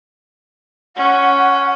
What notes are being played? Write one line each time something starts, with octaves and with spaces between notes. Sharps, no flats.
C#4 F#5